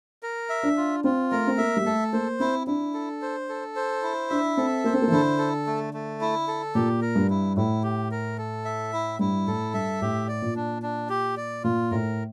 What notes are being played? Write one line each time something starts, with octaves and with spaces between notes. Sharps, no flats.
A#4
E5
D4
F4
C4 F4
A3 A#4
C4
A#3 E5
G3
A3 A4
A#3 C5
C4 E4
D4 E4
A4
C5
A4
C5
E4
D4 E5
C4 A4
A#3 C5
C4
A#3
E3
D3 E4
A4
A3
A3
E4
A4
A#2 G4
A#4
G2
E4
A2 E4
G4
A#4
A4
E5
E4
G2 E4
A2 A4
G2 E5
A2 G4
D5
A#2
D4
D4
G4
D5
A#2 F4
A2 A#4